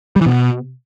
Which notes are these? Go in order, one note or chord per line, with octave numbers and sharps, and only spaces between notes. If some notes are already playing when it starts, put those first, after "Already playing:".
G3
E3
B2